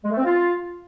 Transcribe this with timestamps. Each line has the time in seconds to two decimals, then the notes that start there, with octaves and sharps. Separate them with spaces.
0.05 G#3
0.11 A3
0.18 C4
0.24 F4